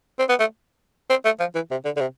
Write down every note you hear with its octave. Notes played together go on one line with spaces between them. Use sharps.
C4
B3
A3
C4
A3
F3
E3
C3
D3
D3
C3